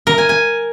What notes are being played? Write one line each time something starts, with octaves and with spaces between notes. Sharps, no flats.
A#4
G#5
G#5